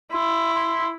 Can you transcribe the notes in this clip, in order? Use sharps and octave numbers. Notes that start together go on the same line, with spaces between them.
E4 C6
C6